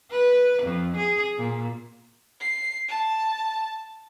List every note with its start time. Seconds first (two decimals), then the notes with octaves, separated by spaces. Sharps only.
0.11 B4
0.63 F2
0.97 G#4
1.37 A#2
2.40 C7
2.88 A5